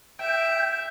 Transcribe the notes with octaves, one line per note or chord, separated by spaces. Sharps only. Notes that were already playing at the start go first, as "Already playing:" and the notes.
E5 G5